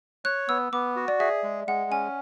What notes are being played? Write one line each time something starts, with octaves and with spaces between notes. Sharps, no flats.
C#5 F#6
B3 E6
B3 D6
F#4
D5
G#4 E5
G#3
G#3 F#5
C#4 G#5